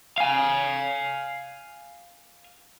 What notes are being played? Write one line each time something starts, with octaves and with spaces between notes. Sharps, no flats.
F5 G#5